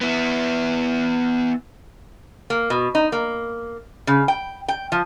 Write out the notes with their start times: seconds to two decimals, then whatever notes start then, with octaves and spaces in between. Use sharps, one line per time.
0.01 B3 E4
2.50 A#3
2.70 B2
2.95 D#4
3.12 A#3
4.07 C#3
4.28 G5
4.68 G5
4.92 F3